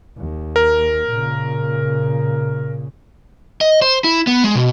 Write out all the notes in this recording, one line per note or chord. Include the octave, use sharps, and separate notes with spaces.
D#2
A#4
A#2 C#3
D#5
C5
E4
B3
G#3
B2